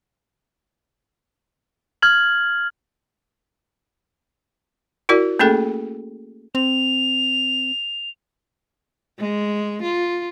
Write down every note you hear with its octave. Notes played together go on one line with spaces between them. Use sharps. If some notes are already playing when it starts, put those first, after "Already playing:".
F6 G#6 F#7
E4 F#4 A#4 D5
A3 A#3 C#4 G#4 A4
C4 F7
G#3
F4